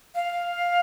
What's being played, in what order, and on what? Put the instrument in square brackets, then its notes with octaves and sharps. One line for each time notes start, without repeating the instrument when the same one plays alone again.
[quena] F5